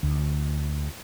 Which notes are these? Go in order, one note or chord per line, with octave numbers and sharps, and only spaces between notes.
D2